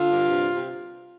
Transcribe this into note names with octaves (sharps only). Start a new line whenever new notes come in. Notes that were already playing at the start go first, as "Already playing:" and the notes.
Already playing: D3 F4
G2
C3
C3